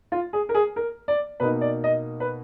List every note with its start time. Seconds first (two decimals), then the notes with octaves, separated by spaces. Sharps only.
0.12 F4
0.33 G#4
0.49 A#4
0.54 G#4
0.76 A#4
1.08 D5
1.40 B2 A#3 D#4 B4
1.61 D5
1.84 D#5
2.20 B4